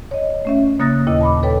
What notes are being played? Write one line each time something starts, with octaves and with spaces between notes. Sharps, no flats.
C#5 D#5
A3 C#4 E5
C#3 A#3 D#6 F#6 A6 A#6
D#2 A#2 E4 D#5
A5 B5 D6
A4 B4 C#5 G5